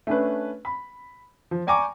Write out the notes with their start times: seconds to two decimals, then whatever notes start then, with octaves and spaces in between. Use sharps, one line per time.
0.07 A3 C#4 D4 B4
0.65 B5
1.51 F3
1.67 D5 G5 G#5 A#5 C#6 D6